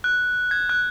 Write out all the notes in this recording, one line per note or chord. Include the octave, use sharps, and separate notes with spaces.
F#6
G#6
F#6